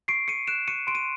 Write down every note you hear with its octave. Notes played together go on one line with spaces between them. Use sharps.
C#6 C7 D7
C#6 C#7 D#7
F#6 D7 E7
C#6 C#7 D#7
C6 D7
D#7